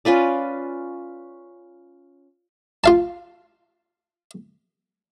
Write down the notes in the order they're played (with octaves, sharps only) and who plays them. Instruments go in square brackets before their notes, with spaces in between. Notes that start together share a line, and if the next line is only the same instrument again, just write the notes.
[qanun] C#4 F4 B4 D5
[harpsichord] F4 F5 A5